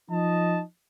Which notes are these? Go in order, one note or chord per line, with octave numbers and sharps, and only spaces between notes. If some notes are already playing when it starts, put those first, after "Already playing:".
F3 D#4 D#5 A5